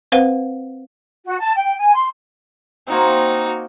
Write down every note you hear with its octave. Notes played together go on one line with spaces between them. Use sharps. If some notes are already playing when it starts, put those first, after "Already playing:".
C4 B4 C5 F5 F#5
F#4
A5
G5
G#5
C6
A#3 C4 D#4 F#4